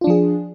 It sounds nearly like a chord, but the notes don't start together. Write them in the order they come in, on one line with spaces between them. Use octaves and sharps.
F4 D4 F3 G#4